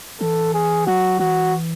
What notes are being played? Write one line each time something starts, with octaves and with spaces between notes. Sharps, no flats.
E3 A4
G#4
F#3 F#4
E3 F#4